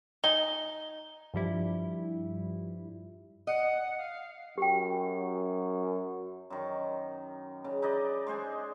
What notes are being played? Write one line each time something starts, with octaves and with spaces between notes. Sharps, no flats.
D#4 G#5 G7
G2 F3 G3 E4
D#5 F#5
F5
F#2 G4 G5
F#2 D#3
C#3
D#4 B4 D5 D#5
G#3 G#4 C5 G#5